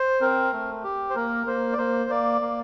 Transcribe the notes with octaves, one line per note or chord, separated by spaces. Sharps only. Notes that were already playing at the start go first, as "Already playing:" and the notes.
Already playing: C5
C4 A#4
A3
G4
C5
A#3 A#4
A#3 C5
D5
A#3 C5
A#3 D5
A#3